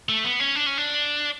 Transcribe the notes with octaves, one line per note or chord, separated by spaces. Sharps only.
A3
B3
C#4
D4
C#4
D4